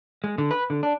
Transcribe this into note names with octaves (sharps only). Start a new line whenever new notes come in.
G#3
D3
B4
D3
D4